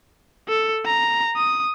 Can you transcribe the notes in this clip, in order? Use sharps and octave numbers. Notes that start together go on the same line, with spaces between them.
A4
A#5
D#6